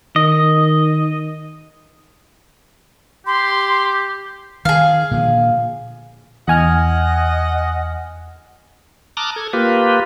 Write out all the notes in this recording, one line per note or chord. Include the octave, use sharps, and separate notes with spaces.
D#3 D#5
G4 C6
D#3 G#4 F5
A#2 D3 F3
E2 D#5 F#5 G#5 F6
A5 A#5 D6 D#6 F6 F#6
A4 G#6
A#3 F4 G4 B4